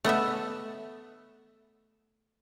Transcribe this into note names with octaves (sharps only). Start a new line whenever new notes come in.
A3 B3 D#5 E5